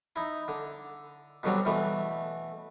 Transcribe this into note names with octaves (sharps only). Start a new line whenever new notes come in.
D#4 E4
D3
B2 D3 F#3 G3 C4
B2 E3 A3